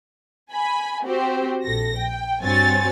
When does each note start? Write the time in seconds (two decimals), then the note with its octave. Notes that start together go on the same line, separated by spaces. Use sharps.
0.51 G#5 B5
1.04 C4 F#4 G4 C5
1.64 A#1 A4 A#6
1.96 G5
2.42 G2 C4 F#4 C#5 G#5 A6